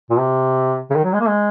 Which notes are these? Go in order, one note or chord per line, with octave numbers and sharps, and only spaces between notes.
A#2
C3
C#3
D#3
F#3
G#3
A#3
G#3